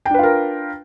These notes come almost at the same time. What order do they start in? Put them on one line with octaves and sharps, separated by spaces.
G5 D4 B4 F4 A#4